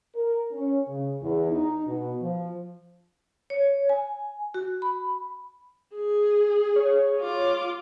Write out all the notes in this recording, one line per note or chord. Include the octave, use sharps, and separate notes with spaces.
A#4
C#4
C#3
E2
D#4
B2
F3
C#5
G#5
F#4
B5
G#4
C#5
F4 D6